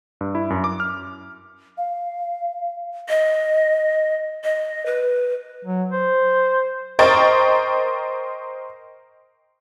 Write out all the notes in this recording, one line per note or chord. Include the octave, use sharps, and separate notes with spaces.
G2
E4
F#2
D6
F6
F5
D#5
D#5
B4
F#3
C5
A#4 C5 D#5 G5 C#6 A6